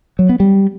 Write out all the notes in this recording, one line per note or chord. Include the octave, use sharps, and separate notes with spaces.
F#3
B3
G3